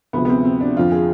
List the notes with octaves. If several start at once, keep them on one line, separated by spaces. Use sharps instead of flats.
D2 C3 F3 G#3 B3
B3
C4
C4
D4
F2 D3 F3 F4
G#4